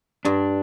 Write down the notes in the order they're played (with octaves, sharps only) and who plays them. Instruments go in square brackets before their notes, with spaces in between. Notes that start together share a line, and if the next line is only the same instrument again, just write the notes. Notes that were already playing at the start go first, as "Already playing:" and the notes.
[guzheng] G2 [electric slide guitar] D4